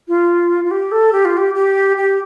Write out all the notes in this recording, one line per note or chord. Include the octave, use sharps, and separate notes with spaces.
F4
F4
G4
A4
G4
F4
G4
G4
G4